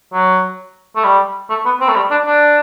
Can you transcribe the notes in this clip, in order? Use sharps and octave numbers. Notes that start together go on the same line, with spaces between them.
F#3
A3
G3
A3
B3
C4
A3
G3
D4
D4